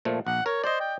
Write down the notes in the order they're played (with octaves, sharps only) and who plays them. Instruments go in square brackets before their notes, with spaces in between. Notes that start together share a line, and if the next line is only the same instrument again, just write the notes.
[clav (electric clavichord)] A#2 F3 A3
[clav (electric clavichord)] A#1 [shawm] F#5
[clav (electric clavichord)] A#4 [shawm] C#5
[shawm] C5 [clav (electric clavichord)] D5 D#5
[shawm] G5